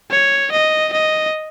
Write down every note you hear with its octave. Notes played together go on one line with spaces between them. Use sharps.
C#5
D#5
D#5